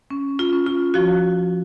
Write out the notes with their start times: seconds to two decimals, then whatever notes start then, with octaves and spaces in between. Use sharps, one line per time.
0.10 C#4
0.39 F4
0.53 C#4
0.66 F4
0.94 F3 F#4